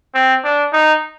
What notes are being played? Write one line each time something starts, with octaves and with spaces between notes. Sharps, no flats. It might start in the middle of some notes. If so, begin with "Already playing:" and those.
C4
D4
D#4